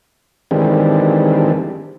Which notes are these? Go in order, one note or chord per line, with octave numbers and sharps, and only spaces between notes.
D#3 E3 G3 G#3 C4 D4